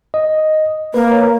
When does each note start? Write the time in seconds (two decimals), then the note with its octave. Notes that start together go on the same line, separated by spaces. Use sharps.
0.14 D#5
0.94 A#3 B4
1.12 C#5